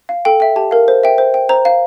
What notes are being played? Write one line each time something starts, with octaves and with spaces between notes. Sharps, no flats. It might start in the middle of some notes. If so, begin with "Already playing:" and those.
F5
A4 G5
E5 G5
G4 A5
A#4 F5
C5
E5 G5
C5
G5
C5 A#5
F5